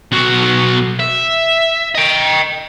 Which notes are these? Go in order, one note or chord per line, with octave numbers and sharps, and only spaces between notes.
B1 F#4
E5
D#5 G5